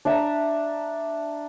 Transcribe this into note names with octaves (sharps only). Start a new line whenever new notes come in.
D4 E5 A5 A#5